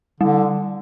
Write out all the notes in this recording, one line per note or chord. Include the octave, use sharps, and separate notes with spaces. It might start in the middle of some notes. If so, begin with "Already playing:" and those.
D3 G3